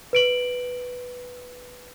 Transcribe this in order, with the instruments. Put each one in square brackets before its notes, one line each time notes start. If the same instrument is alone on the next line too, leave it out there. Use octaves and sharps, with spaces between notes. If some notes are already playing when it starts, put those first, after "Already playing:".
[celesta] B4 D7 F#7